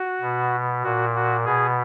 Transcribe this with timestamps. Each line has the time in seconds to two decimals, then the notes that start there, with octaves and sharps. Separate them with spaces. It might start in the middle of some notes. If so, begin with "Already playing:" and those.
Already playing: F#4
0.21 B2
0.83 A#2 F#4
1.15 F#4
1.45 B2 G#4